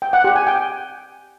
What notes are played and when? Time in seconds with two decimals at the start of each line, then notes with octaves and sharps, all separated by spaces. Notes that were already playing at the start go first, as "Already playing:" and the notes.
0.02 G5
0.13 F#5
0.24 G4
0.36 G#5
0.47 G5